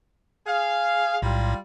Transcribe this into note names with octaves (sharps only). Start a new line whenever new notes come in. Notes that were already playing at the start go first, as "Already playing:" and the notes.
G#4 F5
B1 A2 G3 F4